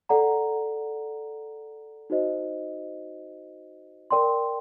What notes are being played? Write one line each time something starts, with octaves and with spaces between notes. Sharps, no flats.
A4 D5 F#5 A#5
D#4 F#4 C5 D#5
A#4 D5 G5 C6